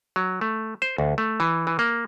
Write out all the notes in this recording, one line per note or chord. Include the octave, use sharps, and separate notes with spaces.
F#3
A3
C5
D2
A3
E3
E3
A#3